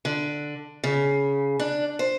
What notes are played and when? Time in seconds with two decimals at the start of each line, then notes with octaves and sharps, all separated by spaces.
0.05 D3
0.84 C#3
1.59 D4
1.99 C5